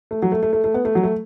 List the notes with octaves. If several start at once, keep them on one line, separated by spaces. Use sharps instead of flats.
A3
F#3
A3
A3
A3
A3
B3
A3
F#3
A3